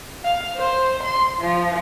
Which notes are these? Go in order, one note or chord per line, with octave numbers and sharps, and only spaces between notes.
F5
C5
C6
F3